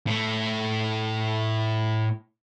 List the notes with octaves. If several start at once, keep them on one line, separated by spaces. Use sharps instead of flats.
A2 A3